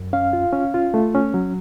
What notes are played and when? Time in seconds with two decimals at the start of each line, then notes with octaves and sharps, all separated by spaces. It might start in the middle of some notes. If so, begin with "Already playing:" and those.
Already playing: F#2
0.13 C#4 F5
0.33 F4
0.53 C#4
0.74 F4
0.94 A3
1.15 C#4
1.34 F#3